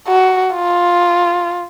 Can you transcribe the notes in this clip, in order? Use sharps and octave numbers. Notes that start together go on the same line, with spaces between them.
F#4
F4